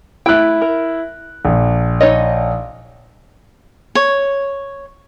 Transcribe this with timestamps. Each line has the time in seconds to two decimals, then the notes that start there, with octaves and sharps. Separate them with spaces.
0.26 A3 E4 G5 F#6
0.62 A#4
1.45 A#1
2.01 D#4 C#5 D#5
3.95 C#5